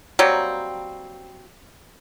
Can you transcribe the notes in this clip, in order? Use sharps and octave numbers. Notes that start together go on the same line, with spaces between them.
F#3 G3 A#3 C4